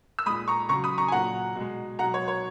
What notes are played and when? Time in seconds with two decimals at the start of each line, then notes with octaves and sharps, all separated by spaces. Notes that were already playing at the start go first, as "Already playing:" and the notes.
0.19 E6
0.26 G#3 B5 D#6
0.30 A#2
0.48 A#5 C#6
0.69 C#3 F#3 A#5 C#6
0.84 B5 D#6
0.98 A#5 C#6
1.08 G#5
1.12 A#2 F#3 F#5 A#5
1.56 B2 G#3
1.99 B2 F#3 F#5 A#5
2.14 C#5
2.28 C#5